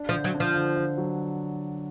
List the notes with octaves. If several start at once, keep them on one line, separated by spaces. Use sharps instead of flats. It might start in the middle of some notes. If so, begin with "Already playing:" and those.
Already playing: D4
F3
D3
F#3
D4
F3
D3
D3
F#3